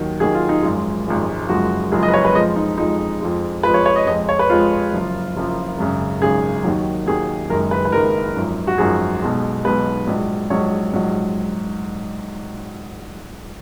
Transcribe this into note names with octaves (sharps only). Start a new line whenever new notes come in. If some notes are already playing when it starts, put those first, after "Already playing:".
Already playing: D#2 D#3 F#3
D#2 D#3 F#3 G#4
F4
D#4
G#1 F#2 F3 G#3 F4
G#1 F#2 F3 G#3
F#1 F#2 F3 G#3 F#4
F#1 F#2 F3 G#3 G#4
D#5
B4
C#5
B4
F2 F3 G#3 D#5
D#4
F2 F3 G#3 D#4
F2 F3 G#3
F2 F3 G#3 B4
C#5
C#5
D#5
F2 F3 G#3 D#5
C#5
B4
F2 F3 G#3 F4
F#1 F#2 F3
F#1 F#2 F3
G#1 F#2 C#3
G#1 F#2 C#3 G#4
D#2 D#3 F#3
D#2 D#3 F#3 G#4
F#1 F#2 D#3 G#3 A#4
B4
B4
F#1 F#2 D#3 G#3 A#4
G#1 F#2 F3
F#4
G#1 F#2 F3 G#4
B1 B2 G#3
B1 B2 G#3 B4
A#1 G#2 F#3
A#1 G#2 F#3 C#5
A#1 G#2 F#3